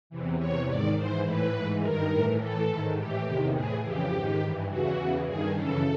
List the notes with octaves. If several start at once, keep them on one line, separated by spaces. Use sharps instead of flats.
E2 C3 E3
E2 C3 E3 C#5
G#2 D#3 D5
G#2 E3 C5
A2 E3 B4
G#2 E3
G2 D#3 A#4
A2 E3
A2 E3 A4
G#2 D#3
A2 E3 G4
E2 C3 D#3
A2 E3 G#4
F2 C#3 E3 G4
G#2 D#3
G2 E3
E2 C#3 E3 F#4
E2 C#3 E3
G2 D#3 G#4
F#2 C#3 E3 A4